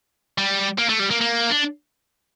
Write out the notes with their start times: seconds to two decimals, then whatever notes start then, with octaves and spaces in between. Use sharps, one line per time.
0.38 G3
0.78 A#3
0.89 A3
1.00 G3
1.11 A#3
1.21 A#3
1.51 D4